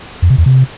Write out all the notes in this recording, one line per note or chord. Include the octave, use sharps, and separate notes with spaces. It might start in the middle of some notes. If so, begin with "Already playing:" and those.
F2
C3
E2
C3